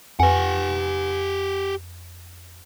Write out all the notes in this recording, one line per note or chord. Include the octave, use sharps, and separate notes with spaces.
F2 G4 B4 F#5 G#5